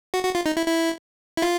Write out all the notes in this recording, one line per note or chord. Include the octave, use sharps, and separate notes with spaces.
F#4
F#4
F4
D#4
E4
E4
E4
F4